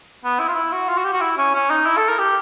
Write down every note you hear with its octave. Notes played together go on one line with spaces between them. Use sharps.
B3
E4
F4
E4
F#4
F4
F#4
G4
F#4
E4
C#4
C#4
D#4
E4
A4
A#4
G4